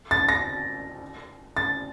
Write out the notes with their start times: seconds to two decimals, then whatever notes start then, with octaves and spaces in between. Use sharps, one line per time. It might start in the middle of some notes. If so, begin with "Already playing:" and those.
0.11 A6
0.29 A#6
1.57 A6